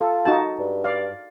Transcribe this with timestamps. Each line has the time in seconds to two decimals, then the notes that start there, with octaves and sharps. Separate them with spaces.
0.01 F4 A4
0.25 D#4 F#4 A5
0.59 G2
0.84 D5 F5